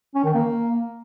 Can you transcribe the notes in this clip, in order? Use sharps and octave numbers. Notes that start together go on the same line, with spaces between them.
C#4
D#3
A#3